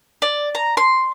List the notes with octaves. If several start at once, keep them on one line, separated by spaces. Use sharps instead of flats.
D5
A#5
C6